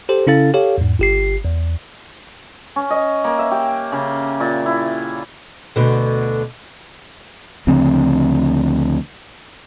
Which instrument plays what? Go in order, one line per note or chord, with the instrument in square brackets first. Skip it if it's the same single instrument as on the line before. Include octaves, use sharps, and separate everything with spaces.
[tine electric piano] G4 A4 C5
C#3 C#4 E4 A4 F5 A6
G4 A4 C#5 F5
E2 G#2
G1 G4 C7
E2
[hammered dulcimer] C#4
D#5
A#3
E5
G4
C#3
A#2
E4
[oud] D2 B2 D3
[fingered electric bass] D2 C#3 F3 C4